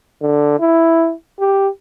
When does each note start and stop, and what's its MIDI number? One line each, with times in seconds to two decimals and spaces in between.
0.22 0.57 50
0.60 1.13 64
1.40 1.68 67